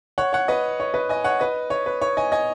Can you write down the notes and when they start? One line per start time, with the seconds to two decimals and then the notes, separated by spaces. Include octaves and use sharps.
0.18 C#5 F#5
0.33 C#5 F#5
0.48 B4 D#5
0.80 C#5
0.94 B4 D#5
1.09 D#5 G#5
1.24 C#5 F#5
1.40 B4 D#5
1.70 C#5
1.86 B4
2.01 C#5
2.17 D#5 G#5
2.32 D#5 G#5